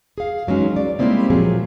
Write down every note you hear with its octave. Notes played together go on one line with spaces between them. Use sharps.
G#4 F5
E3 F#3 G#3 C#4 D#4
D5
G3 G#3 A#3 C4 D#4 E4
A#2 F3 F#3 G#4